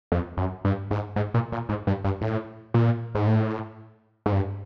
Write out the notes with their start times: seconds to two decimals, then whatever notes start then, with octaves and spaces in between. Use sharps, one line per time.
0.12 F2
0.37 F#2
0.65 G2
0.91 G#2
1.16 G#2
1.34 A#2
1.52 A#2
1.69 G#2
1.87 G2
2.04 G2
2.21 A2
2.74 A#2
3.15 G#2
3.27 A2
4.26 G#2
4.32 G2